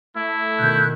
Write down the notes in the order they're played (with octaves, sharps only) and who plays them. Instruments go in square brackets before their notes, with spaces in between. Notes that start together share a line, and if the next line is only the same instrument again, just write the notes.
[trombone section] A3 [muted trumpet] E4
[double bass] B2 D#3 [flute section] F#6 G6